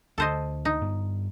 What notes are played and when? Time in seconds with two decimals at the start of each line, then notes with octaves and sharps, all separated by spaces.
0.18 D2 D3 A4 C5 D#5
0.65 D#4
0.82 G2 B3